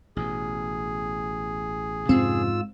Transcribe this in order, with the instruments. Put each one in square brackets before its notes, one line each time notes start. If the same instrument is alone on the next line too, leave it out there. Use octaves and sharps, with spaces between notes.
[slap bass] A1 B2 [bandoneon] G#4
[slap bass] F2 C3 C#4 [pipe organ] G#2 F4 E6 [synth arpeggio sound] C4